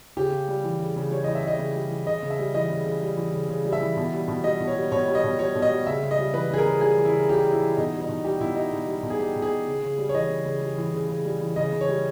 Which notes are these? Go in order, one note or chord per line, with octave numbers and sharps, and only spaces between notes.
C#3 G4
C#3
G3
E3
C#3
C#3
G3 C#5
E3 D#5
E5
C#3 D#5
C#3
G3
E3
C#3 D#5
C#3
E5
G3
E3 D#5
C#3
C#3
G3
E3
C#3
C#3
G3
E5
E3
B2
G3
B2
G3 D#5
B2
C#5
G3
B2 C#5
G3
D#5
B2
G3 C#5
B2
D#5
G3
C#3 E5
C#3
D#5
G3
E3 B4
C#3 G#4
A#4
C#3
G3 G#4
E3
E4
C#3
C#3 G4
G3
E4
E3
B2 D#4
G3
D#4
B2
G3 G4
B2 E4
G3 D#4
B2
G3
B2
G#4
G3 G4
B2
G#4
G3
C#3
C#3
G3
C#5
E3 D#5
C#3
C#3
G3
E3
C#3
C#3
G3
E3
C#3 D#5
C#3
C#5
G3